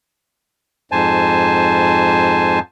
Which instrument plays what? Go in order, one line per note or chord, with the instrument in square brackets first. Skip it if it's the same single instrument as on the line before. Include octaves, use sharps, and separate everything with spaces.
[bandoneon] F2 G#2 C5 G#5 A5